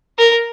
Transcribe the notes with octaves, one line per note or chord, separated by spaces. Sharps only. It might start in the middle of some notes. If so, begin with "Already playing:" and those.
A#4